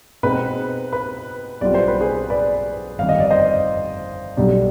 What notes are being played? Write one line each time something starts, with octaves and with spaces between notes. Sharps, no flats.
B2 G#3 C4 D#4 B4
B4
B1 B2 G3 C4 F4 D5
C5
B4
G#4 C5
B4 D5
G1 F2 D#3 F5
D#5
D5
C5 D#5
B1 B2 G3 D4